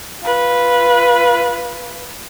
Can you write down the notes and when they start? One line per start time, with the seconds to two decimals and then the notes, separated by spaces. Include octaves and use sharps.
0.23 F4 B4